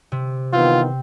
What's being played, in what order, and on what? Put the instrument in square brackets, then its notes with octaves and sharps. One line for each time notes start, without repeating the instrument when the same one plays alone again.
[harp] C3
[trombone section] D#3 E3 B3 [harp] C4 [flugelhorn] F4